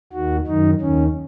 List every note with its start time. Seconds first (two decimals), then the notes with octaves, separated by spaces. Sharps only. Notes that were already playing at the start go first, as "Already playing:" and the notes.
0.13 D#2 D#3 F#4
0.47 F#2 D#3 D#4
0.81 D#2 D#3 C#4